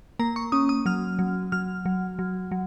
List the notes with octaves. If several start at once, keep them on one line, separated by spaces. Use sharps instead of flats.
A#3 A#5
C#6
C#4 D#6
D#6
F#3 F6
F#3
F#3 F6
F#3
F#3
F#3